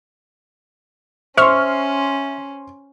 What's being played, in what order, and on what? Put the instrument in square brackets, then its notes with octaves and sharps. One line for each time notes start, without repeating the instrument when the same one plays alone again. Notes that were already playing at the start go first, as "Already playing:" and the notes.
[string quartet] C#4 [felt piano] C5 C6 [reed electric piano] E5 [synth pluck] C#6 F6